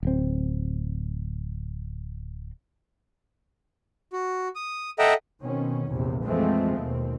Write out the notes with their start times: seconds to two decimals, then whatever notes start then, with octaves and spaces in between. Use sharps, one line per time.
0.03 D1 C4
4.13 F#4
4.56 D#6
4.99 A4 D#5 E5 F#5 G5 A#5
5.43 B2 D#3 C4 C#4
5.89 A#1 E2 C3
6.24 F2 E3 F3 G#3 A3 C4
6.75 D#2 B2 C4